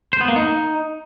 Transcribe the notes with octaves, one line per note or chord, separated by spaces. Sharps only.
C5
B3
A#3
D#4